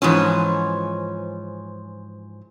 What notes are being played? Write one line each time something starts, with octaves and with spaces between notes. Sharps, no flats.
G#2 E3 F3 C#4